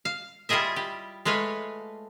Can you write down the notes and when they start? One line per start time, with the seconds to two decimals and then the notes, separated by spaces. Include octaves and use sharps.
0.05 F5
0.49 G3 E4 F4 G#4 D#5 E5
0.76 G4
1.25 G#3 A3 B4 C#5 F5